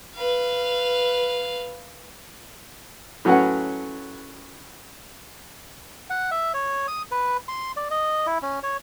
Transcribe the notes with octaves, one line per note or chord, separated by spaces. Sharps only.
B4 F5
A2 F#3 C#4 F#4 B4 F#5
F#5
E5
C#5
D#6
B4
C6
D5
D#5
E4
C#4
C#5